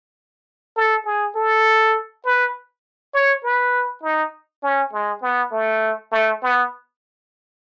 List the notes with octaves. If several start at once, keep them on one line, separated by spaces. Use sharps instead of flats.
A4
G#4
A4
B4
C#5
B4
D#4
C#4
G#3
B3
A3
A3
B3